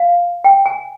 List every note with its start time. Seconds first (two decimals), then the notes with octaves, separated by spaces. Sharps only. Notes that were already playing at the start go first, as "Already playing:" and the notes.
Already playing: F5
0.44 G5
0.66 G#5